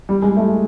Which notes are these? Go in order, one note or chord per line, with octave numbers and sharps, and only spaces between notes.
G3
G#3
A3